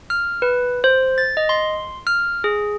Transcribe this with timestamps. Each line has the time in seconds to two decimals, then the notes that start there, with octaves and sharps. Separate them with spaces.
0.10 F6
0.42 B4
0.84 C5
1.18 A6
1.37 D#5
1.49 C6
2.07 F6
2.44 G#4